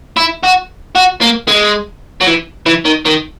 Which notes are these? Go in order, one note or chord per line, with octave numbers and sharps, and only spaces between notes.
E4
F#4
F#4
A#3
G#3
F#3
E3
E3
D#3
D#3